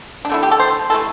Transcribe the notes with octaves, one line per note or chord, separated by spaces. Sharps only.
D4
D3 A3 E4
G4
A4
C5
C3 E3 A3 A4